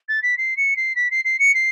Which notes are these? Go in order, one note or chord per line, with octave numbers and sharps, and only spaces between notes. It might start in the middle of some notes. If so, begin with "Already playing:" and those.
A6
B6
C7
C#7
C7
B6
C7
C7
C#7
C7